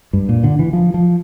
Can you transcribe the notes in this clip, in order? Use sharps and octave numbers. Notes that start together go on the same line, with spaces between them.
G2
A#2
D3
E3
F3
F3